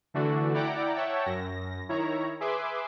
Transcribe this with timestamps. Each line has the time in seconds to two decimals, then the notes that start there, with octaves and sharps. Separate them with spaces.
0.14 D3 E3 A3 D4 F#4
0.54 E4 D5 F#5 G5 A#5 D6
0.95 C#5 E5 F#5 G5 A5
1.26 F#2 A#6
1.89 D#3 E4 C#5 A#5
2.40 G#4 B4 E5 C6 D6